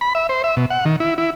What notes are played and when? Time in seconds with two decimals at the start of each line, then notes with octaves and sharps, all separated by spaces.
0.01 B5
0.15 E5
0.29 C5
0.44 E5
0.57 B2
0.70 F#5
0.85 D#3
1.00 E4
1.18 E4